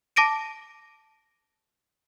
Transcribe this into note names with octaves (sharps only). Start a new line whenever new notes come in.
A5 D6 A#6 D7 D#7